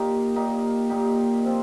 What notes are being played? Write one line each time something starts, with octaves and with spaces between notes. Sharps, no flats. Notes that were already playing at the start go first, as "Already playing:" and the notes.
Already playing: A#2 A#3 D#4 G4
A#2 A#3 D#4 G4
A#2 A#3 D#4 G4
F3 C4 F4